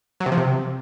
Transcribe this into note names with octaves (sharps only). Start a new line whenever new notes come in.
F#3
C3
F3
C3